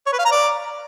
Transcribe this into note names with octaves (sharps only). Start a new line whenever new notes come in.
C#5
B4
F5
A#5
D5